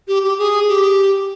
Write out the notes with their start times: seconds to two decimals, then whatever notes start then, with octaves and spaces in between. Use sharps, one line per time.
0.08 G4
0.23 G4
0.39 G#4
0.68 G4